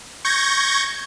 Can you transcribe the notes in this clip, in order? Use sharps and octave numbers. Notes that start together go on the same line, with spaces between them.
C#6 G6 G#6 A#6